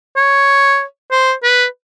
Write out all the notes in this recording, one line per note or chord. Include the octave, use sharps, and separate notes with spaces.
C#5
C5
B4